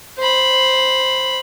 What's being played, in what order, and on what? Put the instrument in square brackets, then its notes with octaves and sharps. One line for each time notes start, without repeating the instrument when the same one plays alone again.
[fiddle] C5 B5